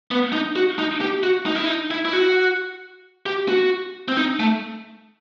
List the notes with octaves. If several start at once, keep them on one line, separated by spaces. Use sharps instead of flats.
B3
D#4
F#4
D#4
G4
F#4
D#4
E4
D#4
E4
E4
F#4
G4
F#4
C4
D#4
A3